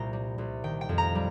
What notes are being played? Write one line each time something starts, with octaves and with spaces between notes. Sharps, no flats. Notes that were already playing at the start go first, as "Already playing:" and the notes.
Already playing: C2 A#2 G5 A#5
G3
C2
D#3 G5
G5
F2
A#5
G3